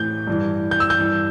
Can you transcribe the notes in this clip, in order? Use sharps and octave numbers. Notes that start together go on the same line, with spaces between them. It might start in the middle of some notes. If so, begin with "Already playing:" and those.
Already playing: A2 E3 G6
G2 E3
G6
E6
G6
G2 E3